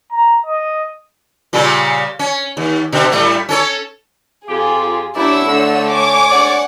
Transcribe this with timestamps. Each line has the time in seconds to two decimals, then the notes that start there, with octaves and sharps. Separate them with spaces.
0.12 A#5
0.46 D#5
1.53 A#2 C#3 G3
2.19 C#4
2.57 D#2
2.92 B2 D3
3.12 A2 G3 A3
3.49 C#4 A4 C#5
4.48 F2 F4 G4 G#4
5.16 D#2 D4 E4 C#5 D5 F#5 E6
5.47 D3 A3
5.90 C#5 G#5 D6
6.31 G#3 D4 D5 F#5